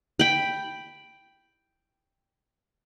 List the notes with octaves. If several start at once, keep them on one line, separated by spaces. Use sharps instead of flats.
G5 B5